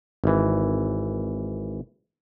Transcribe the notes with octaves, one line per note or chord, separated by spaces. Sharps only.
G#1 E3